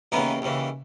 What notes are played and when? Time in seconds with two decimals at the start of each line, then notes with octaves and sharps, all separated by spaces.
0.12 D#2 C#3 E3 B3 D#4
0.42 D#2 C#3 E3